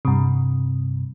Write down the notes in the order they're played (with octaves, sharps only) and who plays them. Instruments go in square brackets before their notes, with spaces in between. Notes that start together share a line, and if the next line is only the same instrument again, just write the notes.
[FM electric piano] G2 C3